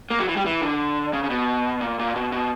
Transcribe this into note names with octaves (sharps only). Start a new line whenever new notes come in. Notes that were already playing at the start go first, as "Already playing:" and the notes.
A#3
F#3
E3
G3
E3
D3
C#3
C#3
B2
A#2
A#2
B2
B2